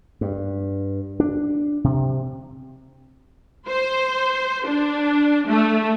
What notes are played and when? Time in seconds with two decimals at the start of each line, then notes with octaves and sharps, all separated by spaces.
0.21 G2
1.20 D4
1.84 C3
3.67 C5
4.66 D4
5.48 A3